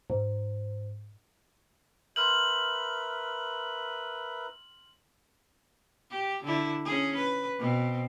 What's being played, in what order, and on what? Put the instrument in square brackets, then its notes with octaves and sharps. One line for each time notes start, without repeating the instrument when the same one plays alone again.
[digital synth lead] G#2
[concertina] A#4 B4 E5 [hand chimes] C6 F6 G6 [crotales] F#7
[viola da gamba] G4
D3 E4
C#4 G#4
B4
B2 C4